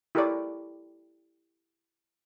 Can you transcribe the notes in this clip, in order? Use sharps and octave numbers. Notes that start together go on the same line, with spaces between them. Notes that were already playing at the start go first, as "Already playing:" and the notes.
E4 G4 A4 A#4 C#5 D5